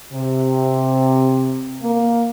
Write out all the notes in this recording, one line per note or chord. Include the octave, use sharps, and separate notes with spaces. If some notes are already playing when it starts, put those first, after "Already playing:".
C3
A#3